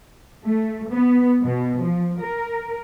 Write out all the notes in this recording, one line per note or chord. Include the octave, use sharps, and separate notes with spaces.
A3
B3
B2
F3
A#4